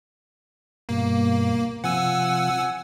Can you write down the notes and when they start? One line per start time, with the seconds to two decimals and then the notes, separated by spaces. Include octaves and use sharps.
0.89 G2 B2 A#3
1.84 C3 F3 F#5 G#5 E6